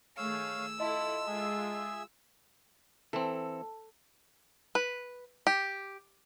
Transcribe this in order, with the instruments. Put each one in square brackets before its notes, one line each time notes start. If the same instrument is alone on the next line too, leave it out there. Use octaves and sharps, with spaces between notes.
[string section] D#3 A3 G#4 [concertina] C#5 F5 [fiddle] E6
[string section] E4 A4 [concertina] F4 [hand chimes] D#5 A5
[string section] G#3 F4 [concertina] G#4 E5
[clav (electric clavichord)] E3 C4 [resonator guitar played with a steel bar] A4
[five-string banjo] B4
G4